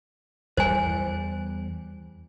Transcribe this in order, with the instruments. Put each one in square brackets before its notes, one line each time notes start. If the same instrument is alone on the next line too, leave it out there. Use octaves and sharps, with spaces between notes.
[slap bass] E2 G3 [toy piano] C5 G#5